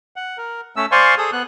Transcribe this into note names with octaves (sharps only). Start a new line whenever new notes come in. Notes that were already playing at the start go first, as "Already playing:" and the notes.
F#5
A#4
A3 C#4 E6
C5 D5 F5 G#5 C6 C#6
G#4 A4 D#6
B3 F#6